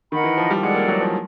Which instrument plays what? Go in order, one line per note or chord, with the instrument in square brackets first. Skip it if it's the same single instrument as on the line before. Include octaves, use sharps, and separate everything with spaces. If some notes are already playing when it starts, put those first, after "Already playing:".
[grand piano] D#3 [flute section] A#4 D#5 F#5 B5
[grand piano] E3
F3
G3
[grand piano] G#3 [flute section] A4 D5 F#5
[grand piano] A#3
F#3
F3